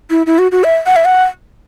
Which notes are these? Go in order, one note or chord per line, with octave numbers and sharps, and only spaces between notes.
E4
E4
F#4
F#4
E5
F#5
E5
F#5